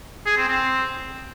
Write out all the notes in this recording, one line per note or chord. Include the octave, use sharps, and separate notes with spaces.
G#4
C4
C4